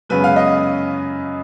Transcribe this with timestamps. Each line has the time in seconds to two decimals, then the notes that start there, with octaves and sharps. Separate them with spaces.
0.09 F#2 C#3 G#3 B3 B4
0.24 F5
0.36 D#5